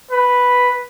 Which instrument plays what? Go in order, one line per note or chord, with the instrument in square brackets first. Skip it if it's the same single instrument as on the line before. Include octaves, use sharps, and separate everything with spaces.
[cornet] B4